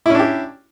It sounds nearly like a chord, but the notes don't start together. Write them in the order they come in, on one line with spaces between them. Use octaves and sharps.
E4 C#4 D4 G4